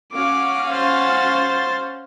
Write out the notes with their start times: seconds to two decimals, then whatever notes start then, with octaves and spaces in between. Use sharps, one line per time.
0.13 C#4 F#4 F5 D6
0.72 C5 A6